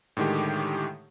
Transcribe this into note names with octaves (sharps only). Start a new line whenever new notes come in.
A2 D3 D#3 G#3 G4